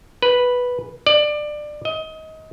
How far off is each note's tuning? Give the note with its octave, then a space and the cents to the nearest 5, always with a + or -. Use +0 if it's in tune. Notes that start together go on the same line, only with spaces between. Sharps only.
B4 -5
D5 +20
D#5 +25